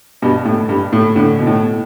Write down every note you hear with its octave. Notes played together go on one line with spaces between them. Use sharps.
G2 B2
A2
G2
A2
A2 D3
B2
A2